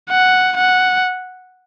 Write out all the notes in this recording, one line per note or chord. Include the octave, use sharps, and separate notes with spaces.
F#5
F#5